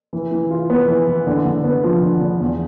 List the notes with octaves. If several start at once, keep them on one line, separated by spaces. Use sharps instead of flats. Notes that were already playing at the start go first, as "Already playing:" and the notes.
E3
E3
F4
B3
E3
E3
D3
D3
B3
F3
D3
D3
E2